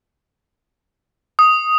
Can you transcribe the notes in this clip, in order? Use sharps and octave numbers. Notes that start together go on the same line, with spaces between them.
D#6